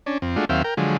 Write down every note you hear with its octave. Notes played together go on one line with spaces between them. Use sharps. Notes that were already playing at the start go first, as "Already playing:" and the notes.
C#4 D4
F2 C4
G#3 A3 D4 F4 F#4
D#2 F#3 C4 E5 F5 G5
A#4 G5
D3 F3 F#3 G#3